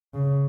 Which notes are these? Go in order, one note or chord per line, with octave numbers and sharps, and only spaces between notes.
C#3